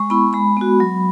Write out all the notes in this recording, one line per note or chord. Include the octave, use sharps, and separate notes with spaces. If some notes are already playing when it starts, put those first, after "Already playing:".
Already playing: G#3 C#6
B3 E4 B5
G#3 B5
B3 F#4
F#3